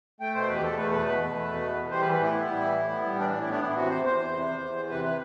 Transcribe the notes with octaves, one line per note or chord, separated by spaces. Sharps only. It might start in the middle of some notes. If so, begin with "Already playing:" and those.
A3 G5
B2 C5
E2 B4
G4
E2 A4
A3 B4
B2 B4
E2 B4
E2
A3
B2
E2
E2
G3 C5
B4
E3
B4
A2 E4
B3
G3
E3
A2
B3
G3
E3 D4
A2 D4
E4
B3 D4
E3 E4
C3 F#4
E2 C5
E2 C5
E3
C3
E2
E2
E3
C3 B4
B4